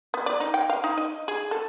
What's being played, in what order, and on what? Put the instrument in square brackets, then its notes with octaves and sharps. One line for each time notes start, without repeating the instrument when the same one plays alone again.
[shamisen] B3
D5
D#4
G5
F5
D#4
D#5
G#4
A4